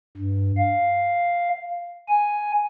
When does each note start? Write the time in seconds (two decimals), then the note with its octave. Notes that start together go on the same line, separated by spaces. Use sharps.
0.17 G2
0.58 F5
2.08 G#5